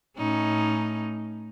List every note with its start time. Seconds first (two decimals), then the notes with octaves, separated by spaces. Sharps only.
0.18 A2 C#4 D#4